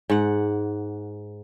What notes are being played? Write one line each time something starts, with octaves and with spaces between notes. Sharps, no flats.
G#2 F#5